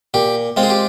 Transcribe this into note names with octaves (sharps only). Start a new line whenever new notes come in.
A#2 G4
G#3 C4 F4
G#4
G4